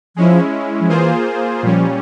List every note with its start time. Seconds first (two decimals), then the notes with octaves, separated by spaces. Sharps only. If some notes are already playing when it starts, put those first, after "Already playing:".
0.16 F3 G#3 C#4 E4
0.80 F3
0.89 E3 A#3 F4 G#4 C5
1.63 A#2 F3 G3 C#4